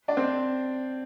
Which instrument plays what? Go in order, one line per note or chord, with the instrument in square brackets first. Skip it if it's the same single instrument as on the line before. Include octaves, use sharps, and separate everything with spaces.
[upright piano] D4 D5
C4 C5